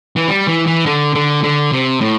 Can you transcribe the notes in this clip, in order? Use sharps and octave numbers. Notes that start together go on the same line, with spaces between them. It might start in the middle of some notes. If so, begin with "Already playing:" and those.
E3
G3
E3
E3
D3
D3
D3
C3
A2